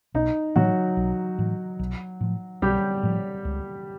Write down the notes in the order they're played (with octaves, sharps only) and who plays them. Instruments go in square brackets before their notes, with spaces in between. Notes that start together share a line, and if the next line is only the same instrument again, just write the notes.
[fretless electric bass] B1 [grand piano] D#4
[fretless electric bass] A2 E3 [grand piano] F#3 F#4
[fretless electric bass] B1
A2 E3
B1
A2 F3
[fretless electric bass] B1 [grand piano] G3 G4
[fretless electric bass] A2 F3
C#2